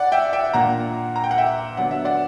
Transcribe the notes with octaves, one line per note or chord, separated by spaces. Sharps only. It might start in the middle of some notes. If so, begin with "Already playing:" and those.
Already playing: E4 D5 F#5
E5 G5
E5 G5
A#2 A#3 D4 F#5 A#5
A#5
G5
F#5
E5 G5
D3 F#3 B3 D4 F#5
E5
D5 F#5